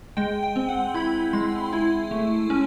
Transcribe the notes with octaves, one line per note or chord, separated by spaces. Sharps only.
G#3 G5
G5
C4
F#5
E4 B5
G#3 C6
E4
A3
C#4